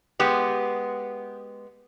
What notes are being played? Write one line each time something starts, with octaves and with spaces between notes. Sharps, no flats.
G#3 B3 G4